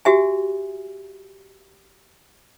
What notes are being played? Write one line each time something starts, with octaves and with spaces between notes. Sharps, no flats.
F#4 G4 E5 G#5